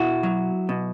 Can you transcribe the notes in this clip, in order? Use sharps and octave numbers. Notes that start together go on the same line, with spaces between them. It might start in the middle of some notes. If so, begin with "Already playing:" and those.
Already playing: B2 E4 F#4
F#3
B2